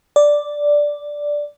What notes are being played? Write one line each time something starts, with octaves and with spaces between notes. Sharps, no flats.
D5